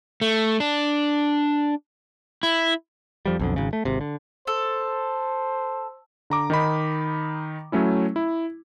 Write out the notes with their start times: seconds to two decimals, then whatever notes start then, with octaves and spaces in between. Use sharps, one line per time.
0.21 A3
0.60 D4
2.43 E4
3.26 F2 F3 G3
3.39 B1 F2 D3
3.56 G#1 C#3
3.73 A3
3.85 G#1 C3
4.01 D3
4.47 A4 C5
6.30 D3 A#5 D6
6.50 D#3 D#4 B5
7.72 F#3 A3 C#4 E4
8.16 E4